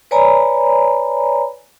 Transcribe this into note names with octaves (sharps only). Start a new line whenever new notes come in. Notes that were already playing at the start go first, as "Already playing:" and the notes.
B4 C#5 D5 G#5 A#5 B5